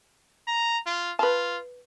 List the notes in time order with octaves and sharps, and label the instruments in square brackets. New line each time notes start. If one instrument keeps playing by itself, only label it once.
[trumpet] A#5
F4
[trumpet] F4 [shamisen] B4 A5